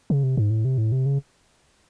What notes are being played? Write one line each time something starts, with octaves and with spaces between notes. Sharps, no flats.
C#3
C3
G#2
A2
C3
A2
C3
C#3